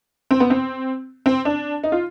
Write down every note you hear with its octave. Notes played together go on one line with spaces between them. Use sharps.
C4
B3
C4
C4
D4
D#4
F4